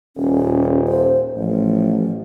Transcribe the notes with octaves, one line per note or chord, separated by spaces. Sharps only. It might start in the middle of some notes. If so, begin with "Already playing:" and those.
D#1 C#4
C5
A1 F3